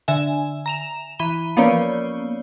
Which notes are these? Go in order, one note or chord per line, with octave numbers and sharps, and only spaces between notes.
D3 E5 G#5
A#5 E7 F7
E3 B5 D#7 G7
F3 A#3 B3 C#4 C#5 D5